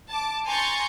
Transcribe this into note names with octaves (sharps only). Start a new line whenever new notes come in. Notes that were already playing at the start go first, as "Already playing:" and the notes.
A5 D6
G#5 A#5 C6 C#6 G6 A6